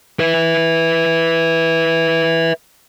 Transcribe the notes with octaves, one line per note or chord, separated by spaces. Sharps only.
B4 E5